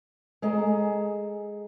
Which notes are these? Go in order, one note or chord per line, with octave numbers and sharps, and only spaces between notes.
G#3 G#4 A4 D#5 A#5